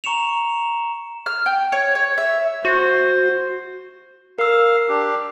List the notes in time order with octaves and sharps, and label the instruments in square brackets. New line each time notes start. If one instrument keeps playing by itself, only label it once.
[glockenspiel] A#5 C#6 C#7 E7 F7
[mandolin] F6
G5
C#5
C#5
E5
[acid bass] F#4 [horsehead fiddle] C5
[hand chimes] A#4 E6 [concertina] F5
[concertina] D4 G4